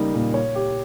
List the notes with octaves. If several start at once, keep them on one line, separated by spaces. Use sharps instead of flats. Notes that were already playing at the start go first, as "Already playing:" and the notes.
Already playing: C#3 G3 A#3 D#4
A#2
C#5
G4